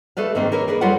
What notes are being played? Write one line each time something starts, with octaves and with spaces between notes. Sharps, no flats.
A3 A4 B4 D5 F5
G#2 D#3 A#3 C4
A#3 A#4 B4 C#5
G#4 A#4 B4 D5
F#3 G3 F4 A4 B4 F#5